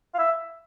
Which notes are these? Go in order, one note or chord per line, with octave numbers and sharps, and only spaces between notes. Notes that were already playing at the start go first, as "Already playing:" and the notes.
F5
E5